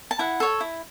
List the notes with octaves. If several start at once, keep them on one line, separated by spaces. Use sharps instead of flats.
A5
E4 F#5
A4 C#5
E4